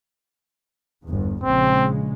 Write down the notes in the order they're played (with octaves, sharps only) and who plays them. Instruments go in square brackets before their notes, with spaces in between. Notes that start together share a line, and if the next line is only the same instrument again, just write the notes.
[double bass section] G1 E2
[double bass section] A#1 C#3 G#3 [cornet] C4